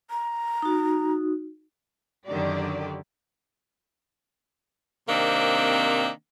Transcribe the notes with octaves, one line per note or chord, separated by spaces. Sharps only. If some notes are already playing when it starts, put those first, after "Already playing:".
A#5
D#4 F#4
F#2 D3 D#3 G4 D5
C3 D#3 A#3 C4 D4